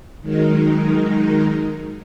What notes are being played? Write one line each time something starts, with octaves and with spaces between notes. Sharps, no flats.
D#3 F#3 G#3 D#4 A#4